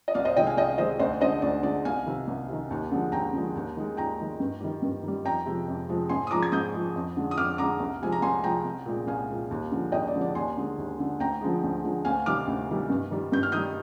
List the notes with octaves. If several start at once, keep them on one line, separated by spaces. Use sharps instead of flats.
D#5
C2 D5 F5
C5 D#5
C3 D#3 G#3 D#5 G5
F5 G#5
C2 D#5 G5
C3 D#3 G#3 C5 D#5
D2 C5 D#5
D3 G#3 C5 D#5
D2 D5
D3 G#3 D5
C2 F5 G#5
C3 D#3
C2
C3 D#3
D#2
D3 F3 G#3
D#2 G5 A#5
D3 F3 G#3
D#2
D#3 G#3
D#2 G5 A#5
D#3 G#3
G2
D#3 G3
G2
D#3 G3
F2 G5 A#5
C3 F3 G#3
F2
C3 F3 G#3
G#2 G#5 C6
D#6
F3 G#3 A#5 D6
G#6
G#2 D#6 G6
F3 G#3
F2
D3 G#3
D#6
F2 D6 F6
D3 G#3 A#5 D6
C2
C3 F3 G#3 G#5
A#5
C2 G#5 C6
C3 F3 G#3 G5 A#5
C2
A#2 G#3
C2 F5 G#5
A#2 G#3
D#2
D3 F3 G#3
D#2 D#5 G5
D5
D3 F3 G#3
D5
D#2 G#5 C6
D3 G#3
D#2
D3 G#3
D2 G5 A#5
D3 F3 G#3
D2
D3 F3 G#3
D2 F5 G#5
C3 D#3 G3 D6 F6
D2
C3 D#3 G3
G2
D#3 G3
G2 G6
F6
D#3 G3 D#6 G6